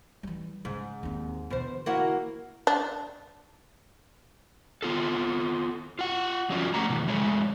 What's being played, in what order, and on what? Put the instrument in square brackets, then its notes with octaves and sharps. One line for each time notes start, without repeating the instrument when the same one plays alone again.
[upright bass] E3 G3
[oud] G#2 [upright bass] C#3
[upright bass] D#2 C4
[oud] B2 C5 [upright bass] D3 E3
[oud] A#3 E4 F#4
[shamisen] D4
[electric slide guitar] B3 F4 A4
F4 F#5
F3 F#3 C#4 F4 D5
A3 G4 F#5 A#5
B2 D#3 E3
F2 G#3 A3 C#5